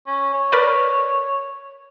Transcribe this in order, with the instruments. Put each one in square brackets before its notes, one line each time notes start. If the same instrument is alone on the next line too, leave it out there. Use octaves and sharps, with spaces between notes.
[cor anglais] C#4
C#5
[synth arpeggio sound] A#4 B4 D5